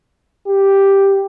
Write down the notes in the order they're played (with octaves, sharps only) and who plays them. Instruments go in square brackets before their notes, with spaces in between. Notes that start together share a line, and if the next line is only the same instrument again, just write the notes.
[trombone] G4